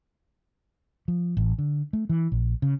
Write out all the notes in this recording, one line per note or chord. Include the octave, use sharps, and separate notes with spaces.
F3
A1
D3
A3
E3
A#1
C#3